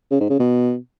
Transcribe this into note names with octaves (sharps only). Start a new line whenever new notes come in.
C#3
G#2
C#3
B2